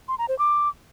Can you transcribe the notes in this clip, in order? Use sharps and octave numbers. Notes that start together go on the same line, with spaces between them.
C6
A#5
C5
D6